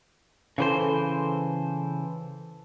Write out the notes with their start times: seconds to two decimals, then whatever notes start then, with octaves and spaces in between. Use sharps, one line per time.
0.58 C#3 E3 A4 C5